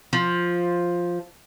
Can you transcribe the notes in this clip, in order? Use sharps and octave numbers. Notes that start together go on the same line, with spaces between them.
F3